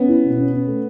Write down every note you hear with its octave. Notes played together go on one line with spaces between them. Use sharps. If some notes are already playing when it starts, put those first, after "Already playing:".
Already playing: B3 C#4
E4
B2
C#4
C#4
A3